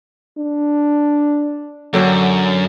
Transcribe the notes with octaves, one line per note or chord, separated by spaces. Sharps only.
D4
F#2 D3 F#3 G5